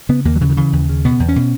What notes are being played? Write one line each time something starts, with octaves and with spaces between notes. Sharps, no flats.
C#3 B3
D#2 A#3
F#3
C#3 E3
D#3
C#3 E3
D#2
C#3
B2 B3
E2
C#4
B2